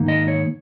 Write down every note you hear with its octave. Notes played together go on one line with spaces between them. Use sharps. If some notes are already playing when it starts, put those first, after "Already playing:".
Already playing: G#2 D#3 A#3 D#4
D#5
C#5